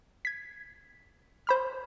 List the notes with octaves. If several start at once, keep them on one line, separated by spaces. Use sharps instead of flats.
G#6 B6
C5 B5 F6